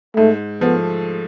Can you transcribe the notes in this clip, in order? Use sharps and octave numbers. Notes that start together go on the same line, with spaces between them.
G#2 A3
F3 A3 B3